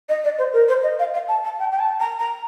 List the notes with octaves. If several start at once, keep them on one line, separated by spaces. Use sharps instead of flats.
D#5
D5
C5
A#4
C5
D#5
F5
F5
A5
A5
G5
G5
A5
A#5
A#5